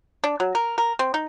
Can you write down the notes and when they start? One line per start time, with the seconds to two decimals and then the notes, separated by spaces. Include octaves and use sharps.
0.24 D4
0.40 F#3
0.55 A#4
0.78 A#4
0.99 C4
1.14 D#4